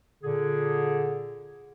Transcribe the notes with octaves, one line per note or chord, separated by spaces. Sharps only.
A#2 D3 G#4